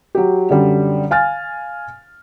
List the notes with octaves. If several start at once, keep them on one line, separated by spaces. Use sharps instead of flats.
F#3 G4
F#2 D3 G3
F5 G#5 F6 A6